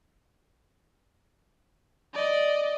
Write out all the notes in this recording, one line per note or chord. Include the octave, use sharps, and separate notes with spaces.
D5 D#5